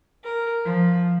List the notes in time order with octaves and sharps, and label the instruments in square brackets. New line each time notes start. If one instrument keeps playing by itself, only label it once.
[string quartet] A#4
F3